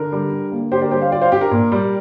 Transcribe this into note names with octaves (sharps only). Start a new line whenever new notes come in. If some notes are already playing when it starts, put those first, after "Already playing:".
Already playing: D3 A#4
G3
D3
A#3
D3 G4 C5
A#4 D5
G3 G4 C5
C5 F5
F4 D5 G5
C5 F5
D4 G4
A#4
A#2
G3